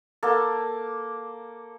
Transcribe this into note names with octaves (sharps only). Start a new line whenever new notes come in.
A#3 A4